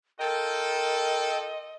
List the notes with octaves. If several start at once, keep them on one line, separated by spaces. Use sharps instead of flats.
F4 A4 A#4 D#5 G5